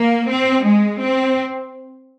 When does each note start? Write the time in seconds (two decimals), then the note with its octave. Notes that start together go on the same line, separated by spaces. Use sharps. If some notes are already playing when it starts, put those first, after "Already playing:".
Already playing: A#3
0.29 C4
0.65 G#3
1.02 C4